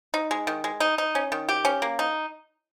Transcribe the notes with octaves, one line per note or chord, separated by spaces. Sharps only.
D#4
G#3
D#3
G#3
D#4
D#4
C#4
D#3
G4
C#4
A#3
D#4